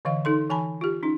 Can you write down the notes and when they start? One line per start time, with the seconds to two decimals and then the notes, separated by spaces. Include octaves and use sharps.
0.05 D3 E3 D#5 F5
0.25 D#4 A4 C6
0.50 E3 G#5 A5 B5
0.81 F4 G4
1.03 C#4 D#4